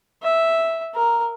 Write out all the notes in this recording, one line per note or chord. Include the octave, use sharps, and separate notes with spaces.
E5
A#4